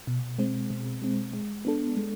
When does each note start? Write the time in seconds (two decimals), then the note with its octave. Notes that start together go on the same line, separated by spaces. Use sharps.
0.07 B2
0.39 G#3 C4
0.70 B2
1.02 G#3 C4
1.33 G#3
1.65 B3 D4 A4
1.97 G#3